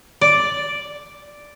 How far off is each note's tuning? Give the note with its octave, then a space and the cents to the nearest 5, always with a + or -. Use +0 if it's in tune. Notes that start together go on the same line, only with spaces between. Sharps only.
D5 +0